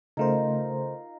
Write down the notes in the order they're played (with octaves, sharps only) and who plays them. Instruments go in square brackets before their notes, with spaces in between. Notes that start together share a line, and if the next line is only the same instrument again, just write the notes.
[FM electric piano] C#3 A3 C5 [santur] D#4 F4 A#4